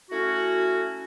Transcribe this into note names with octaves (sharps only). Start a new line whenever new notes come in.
A3 C#4 E4 F#4